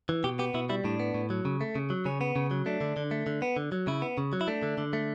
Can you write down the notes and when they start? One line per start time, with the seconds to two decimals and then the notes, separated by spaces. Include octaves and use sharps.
0.09 E3
0.24 B2 G4
0.39 B3 G4
0.54 B2 E4
0.69 G3 E4
0.84 A2 D4
1.00 B3
1.14 A2
1.30 F#3
1.45 C#3
1.61 A3
1.75 C#3
1.90 F#3
2.05 C#3 C#4
2.21 B3
2.36 C#3
2.51 F#3
2.66 A3 D4
2.81 D3
2.97 D3
3.11 A3
3.27 D3
3.42 B3
3.57 D3
3.72 F#3
3.87 C#3 E4
4.02 B3
4.18 C#3
4.33 F#3
4.41 E4
4.48 A3 D4
4.63 D3
4.78 D3
4.93 A3